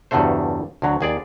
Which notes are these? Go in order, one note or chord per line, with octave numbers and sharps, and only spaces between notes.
E2 G2 C#3 F#3 A3 C5
D2 F#3
D#2 G#4 D5